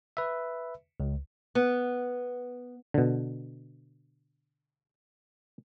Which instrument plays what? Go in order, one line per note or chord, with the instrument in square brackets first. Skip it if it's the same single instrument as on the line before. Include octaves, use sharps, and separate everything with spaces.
[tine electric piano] B4 E5
C#2
[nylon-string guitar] B3
[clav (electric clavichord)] B2 D3